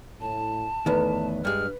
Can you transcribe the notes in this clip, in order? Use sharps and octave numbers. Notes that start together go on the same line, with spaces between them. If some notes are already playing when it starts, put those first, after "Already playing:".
A2 A5
E2 A2 D#3 A3 B4
G2 G#3 D4 F6